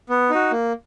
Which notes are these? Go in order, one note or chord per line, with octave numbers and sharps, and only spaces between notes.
B3
D#4 F#4
A#3